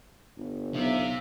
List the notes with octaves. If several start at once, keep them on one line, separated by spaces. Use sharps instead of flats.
G1
B1 C3 E5 F5